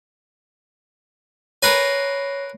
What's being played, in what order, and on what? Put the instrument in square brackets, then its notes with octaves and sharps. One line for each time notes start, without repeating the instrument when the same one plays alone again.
[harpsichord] A#4 B4 G#5 [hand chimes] C#5 A#6 C7